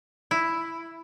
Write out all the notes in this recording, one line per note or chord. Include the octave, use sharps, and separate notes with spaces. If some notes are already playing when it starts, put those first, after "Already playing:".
E4